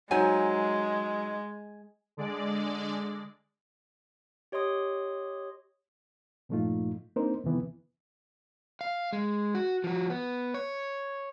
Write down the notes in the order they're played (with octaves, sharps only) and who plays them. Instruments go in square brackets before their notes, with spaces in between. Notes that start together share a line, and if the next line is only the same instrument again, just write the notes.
[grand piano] F#3 [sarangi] G#3 [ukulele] D#4 C5 G#5
[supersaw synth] D3 G#3 D5
[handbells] G4 C#5 D#5 C6 D#6
[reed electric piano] G2 A#2 F3 A3 D#4 F4
A#3 C4 D4 D#4 A#4 C5
F2 C3 D#3 E3 B3
[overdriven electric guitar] F5
G#3
F#4
F3 F#4
B3
C#5